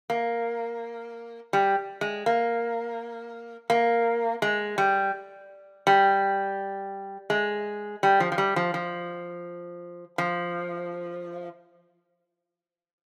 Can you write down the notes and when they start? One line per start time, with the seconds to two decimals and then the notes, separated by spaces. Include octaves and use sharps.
0.10 A#3
1.53 G3
2.01 G#3
2.26 A#3
3.70 A#3
4.42 G#3
4.78 G3
5.87 G3
7.30 G#3
8.03 G3
8.20 F3
8.32 F3
8.38 G3
8.56 F3
8.74 F3
10.18 F3